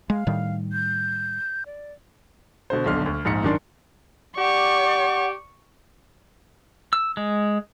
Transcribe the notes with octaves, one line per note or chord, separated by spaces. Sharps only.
G#3 F5
A2 D#3 G3
G6
D5
B2 D3 C5
D#1 B1 D3 C6 F6
D2
A#1 G#2 C#7
F#2 D#3 D4 C6
G4 D5 F#5 C#6
E6
G#3